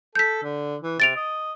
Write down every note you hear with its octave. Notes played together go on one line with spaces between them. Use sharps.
A4 G6 B6
D3
E3
C3 A6 D7 F7
D#5